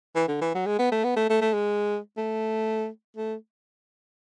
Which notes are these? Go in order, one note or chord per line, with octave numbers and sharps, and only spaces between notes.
E3
D3
E3
F#3
G#3
B3
A3
B3
A3
A3
A3
G#3
A3
A3